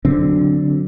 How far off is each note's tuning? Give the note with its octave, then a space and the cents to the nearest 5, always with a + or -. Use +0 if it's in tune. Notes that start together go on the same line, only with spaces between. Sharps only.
D3 +0 F#3 +0 C4 -10